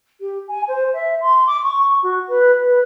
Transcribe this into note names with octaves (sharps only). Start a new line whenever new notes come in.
G4
G#5
C5
E5
C6
D6
C#6
F#4
B4
B4